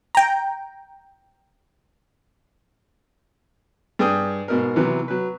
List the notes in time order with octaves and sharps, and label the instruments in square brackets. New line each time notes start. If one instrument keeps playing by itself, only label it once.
[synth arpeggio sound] G5 A#5
[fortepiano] G2 G#4 D5 G5 D#6
G#2 B2 A#4
C3 E3 F#3 B3
F#3 B4